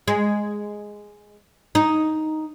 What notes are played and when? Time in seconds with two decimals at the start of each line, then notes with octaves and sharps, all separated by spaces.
0.08 G#3
1.75 D#4